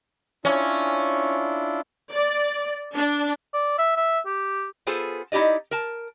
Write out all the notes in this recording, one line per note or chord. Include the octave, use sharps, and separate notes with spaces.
C#4 D4 E4 F4
D5
D4
D5
E5
E5
G4
B3 F4 G#4 A4 C5
D#4 E4 G4 D5 D#5
A#4 A5